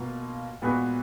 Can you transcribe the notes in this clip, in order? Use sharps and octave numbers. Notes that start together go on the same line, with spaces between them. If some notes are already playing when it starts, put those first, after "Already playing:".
Already playing: B2 A#3 F4
A#2 G#3 B3 F#4 B4